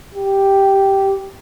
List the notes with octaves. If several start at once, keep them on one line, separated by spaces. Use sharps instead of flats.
G4